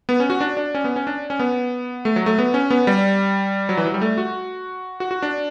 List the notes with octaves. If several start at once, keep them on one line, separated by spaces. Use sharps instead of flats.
B3
C#4
F#4
D4
D4
C#4
B3
C#4
D4
C#4
B3
A3
F#3
A3
B3
C#4
B3
G3
F#3
E3
F#3
G3
A3
F#4
F#4
F#4
D4